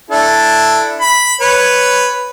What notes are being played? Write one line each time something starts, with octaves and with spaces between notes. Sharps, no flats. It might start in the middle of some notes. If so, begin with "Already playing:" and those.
D4 E4 A4
B5
B4 C#5